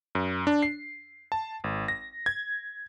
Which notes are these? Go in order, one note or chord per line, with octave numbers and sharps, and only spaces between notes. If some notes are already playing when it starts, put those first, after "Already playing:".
F#2
D4
C7
A5
G#1
A#6
G#6